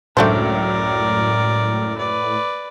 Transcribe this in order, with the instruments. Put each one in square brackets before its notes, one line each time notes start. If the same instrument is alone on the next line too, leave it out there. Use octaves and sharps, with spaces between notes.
[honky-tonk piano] C#2 F#2 [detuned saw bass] A2 [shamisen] A3 D4 C5 [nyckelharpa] A#4 D5
[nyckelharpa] B4 D5